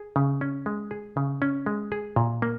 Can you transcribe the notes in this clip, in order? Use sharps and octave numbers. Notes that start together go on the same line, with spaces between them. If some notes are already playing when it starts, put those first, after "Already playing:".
Already playing: G#4
C#3
C#4
G#3
G#4
C#3
C#4
G#3
G#4
A#2
A#3